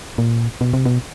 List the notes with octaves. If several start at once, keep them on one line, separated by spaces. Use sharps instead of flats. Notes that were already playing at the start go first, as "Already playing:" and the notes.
A#2
B2
C3
B2